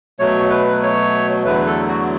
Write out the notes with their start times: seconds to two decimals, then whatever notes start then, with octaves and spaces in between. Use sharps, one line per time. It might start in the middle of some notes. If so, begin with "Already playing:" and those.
0.19 B2 F#3 A3 C#5
0.50 B4
0.83 C#5
1.45 E2 D3 F#3 A3 B4
1.66 A4
1.89 F#4